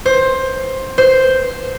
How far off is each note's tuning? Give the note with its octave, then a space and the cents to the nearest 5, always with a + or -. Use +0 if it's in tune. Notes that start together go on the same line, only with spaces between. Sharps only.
C5 +15
C5 -5